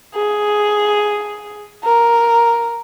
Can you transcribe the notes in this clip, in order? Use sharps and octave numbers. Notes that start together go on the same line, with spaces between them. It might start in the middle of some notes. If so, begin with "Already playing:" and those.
G#4
A#4